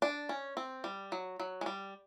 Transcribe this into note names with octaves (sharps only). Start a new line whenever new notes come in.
D4
C#4
C4
G3
F#3
F#3
G#3
G3